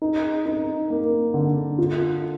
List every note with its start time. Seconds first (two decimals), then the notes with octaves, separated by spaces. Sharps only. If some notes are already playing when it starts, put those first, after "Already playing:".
0.02 D#4
0.46 D#4
0.90 A#3
1.34 D3
1.78 F4